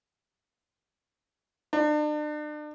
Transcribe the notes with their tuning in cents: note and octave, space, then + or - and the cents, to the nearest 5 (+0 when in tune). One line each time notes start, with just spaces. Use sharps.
D4 +40